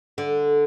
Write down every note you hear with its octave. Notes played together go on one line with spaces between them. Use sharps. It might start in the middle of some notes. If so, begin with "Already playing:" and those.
D3